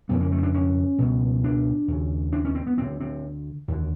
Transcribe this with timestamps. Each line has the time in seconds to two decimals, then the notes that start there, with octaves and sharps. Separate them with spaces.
0.09 F2 C#3 B3
0.20 A#3
0.32 A3
0.43 D4
0.54 C#4
0.98 C#2 B2
1.44 D4
1.88 D#2 C#3
2.33 D4
2.45 C#4
2.55 C4
2.67 B3
2.77 D2 D3 C4
3.00 C4
3.68 D#2 D3